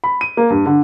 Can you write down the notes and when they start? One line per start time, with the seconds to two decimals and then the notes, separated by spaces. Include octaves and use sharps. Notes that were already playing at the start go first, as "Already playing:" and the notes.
0.04 B5
0.21 D#7
0.37 A#3
0.50 G2
0.66 D3